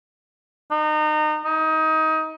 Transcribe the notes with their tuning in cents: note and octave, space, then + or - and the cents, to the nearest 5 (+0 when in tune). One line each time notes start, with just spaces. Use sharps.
D#4 -30
D#4 +25